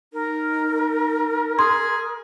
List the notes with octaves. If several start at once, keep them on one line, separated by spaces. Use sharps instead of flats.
D#4 A#4
G#4 C6